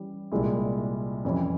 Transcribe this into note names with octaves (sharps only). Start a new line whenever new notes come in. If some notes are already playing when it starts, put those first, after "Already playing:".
Already playing: E3 G3 C#4
C2 A#2 G#3 E4
F2 E3 G3 C#4 E4